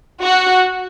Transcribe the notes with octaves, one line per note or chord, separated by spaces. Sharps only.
F#4